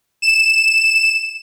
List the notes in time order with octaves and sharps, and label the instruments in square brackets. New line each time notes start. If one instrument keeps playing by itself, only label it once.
[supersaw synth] E7